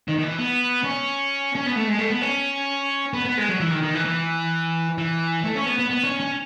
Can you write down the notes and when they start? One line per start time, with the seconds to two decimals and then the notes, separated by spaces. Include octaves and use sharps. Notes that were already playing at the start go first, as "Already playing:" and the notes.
0.08 D#3
0.19 D#3
0.23 E3
0.39 B3
0.84 C#4
1.55 C#4
1.66 B3
1.76 A3
1.88 G#3
1.99 A3
2.10 B3
2.22 C#4
3.13 B3
3.25 B3
3.37 G#3
3.49 F#3
3.60 E3
3.71 D#3
3.83 D#3
3.94 E3
4.05 E3
4.98 E3
5.43 A3
5.55 C#4
5.66 B3
5.78 B3
5.90 B3
6.04 C#4
6.20 C#4